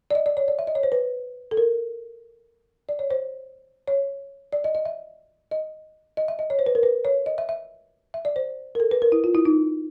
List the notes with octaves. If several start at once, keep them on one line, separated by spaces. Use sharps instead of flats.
D5
D#5
D5
C#5
D5
E5
D#5
C#5
C5
B4
A4
A#4
D5
C#5
C5
C#5
D5
D#5
D#5
E5
D#5
D#5
E5
D#5
C#5
C5
B4
A#4
B4
C#5
D#5
E5
E5
E5
D5
C5
A#4
A4
B4
A#4
E4
F4
E4
D#4